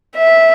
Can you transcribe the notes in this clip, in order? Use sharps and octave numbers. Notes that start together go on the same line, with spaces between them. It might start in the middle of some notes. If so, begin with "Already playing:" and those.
E5